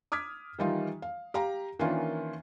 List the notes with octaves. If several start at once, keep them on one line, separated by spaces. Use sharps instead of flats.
D6 D#6 F6 G#6 B6
D#3 E3 G3 D#4 F4
F5
G4 F5 A#5
D#3 E3 A#3 C#4 D4 F4